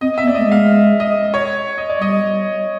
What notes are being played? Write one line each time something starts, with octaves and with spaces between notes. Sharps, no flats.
C4 D#5
E5
B3
D5
A3 D#5
G#3
F5
D#5
C#5
D#5
D5
G3 D#5